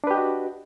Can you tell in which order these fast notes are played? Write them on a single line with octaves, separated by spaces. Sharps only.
D4 B4 G4 D#5 F#4